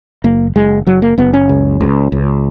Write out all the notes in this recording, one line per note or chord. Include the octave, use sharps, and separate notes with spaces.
F#1 A#3
F#1 G#3
F#1 F#3
A#3
F#1 B3
C#4
C#2
C#2
C#2